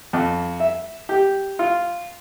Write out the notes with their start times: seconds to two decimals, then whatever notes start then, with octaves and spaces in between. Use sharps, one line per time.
0.13 F2
0.60 E5
1.09 G4
1.59 F4